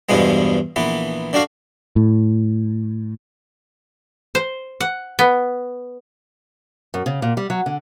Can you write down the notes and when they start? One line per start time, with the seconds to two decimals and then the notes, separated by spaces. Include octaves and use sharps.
0.09 E2 G2 B2 F3 G#3 B3
0.76 A#1 E3 B3
1.33 D3 D4 F#4 F5
1.96 A2
4.35 C5
4.81 F#5
5.19 B3
6.94 F#2
7.06 C#3
7.22 A#2
7.37 G3
7.50 F#3
7.66 D3